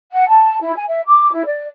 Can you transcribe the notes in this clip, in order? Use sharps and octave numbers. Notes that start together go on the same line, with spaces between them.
F#5
A5
E4
G#5
E5
D6
E4
D5